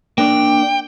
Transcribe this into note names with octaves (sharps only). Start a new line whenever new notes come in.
A#3 D4 D5 G5